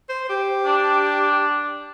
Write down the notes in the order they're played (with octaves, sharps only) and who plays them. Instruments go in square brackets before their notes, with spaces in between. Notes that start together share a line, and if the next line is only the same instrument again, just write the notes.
[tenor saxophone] C5
G4
[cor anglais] D4